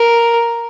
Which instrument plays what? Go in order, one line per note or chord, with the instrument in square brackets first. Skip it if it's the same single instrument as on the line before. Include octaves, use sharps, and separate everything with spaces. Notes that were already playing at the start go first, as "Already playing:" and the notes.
Already playing: [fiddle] A#4